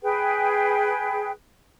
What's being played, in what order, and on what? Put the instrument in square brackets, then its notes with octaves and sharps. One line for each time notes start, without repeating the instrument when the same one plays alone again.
[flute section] G#4 B4 G5